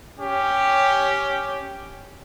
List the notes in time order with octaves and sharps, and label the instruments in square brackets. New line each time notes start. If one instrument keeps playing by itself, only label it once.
[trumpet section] C#4 G4